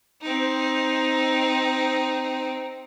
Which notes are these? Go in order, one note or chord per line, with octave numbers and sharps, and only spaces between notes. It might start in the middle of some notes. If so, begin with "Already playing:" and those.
C4 D#4